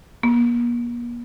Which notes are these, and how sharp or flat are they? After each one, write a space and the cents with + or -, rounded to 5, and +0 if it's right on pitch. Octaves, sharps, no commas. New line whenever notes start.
A#3 +45